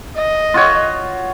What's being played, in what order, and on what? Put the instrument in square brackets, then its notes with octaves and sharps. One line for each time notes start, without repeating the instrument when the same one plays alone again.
[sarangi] D#5
[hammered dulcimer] F4 F#4 C#5